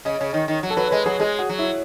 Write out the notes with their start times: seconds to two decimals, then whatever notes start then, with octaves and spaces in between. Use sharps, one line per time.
0.05 C#3 D#5
0.21 C#3
0.34 D#3
0.48 D#3
0.63 F#3
0.70 A4
0.77 F#3 B4
0.91 G#3 B4
1.06 F#3 G#4
1.20 G#3 G#4
1.39 F#4
1.49 F#3
1.59 E4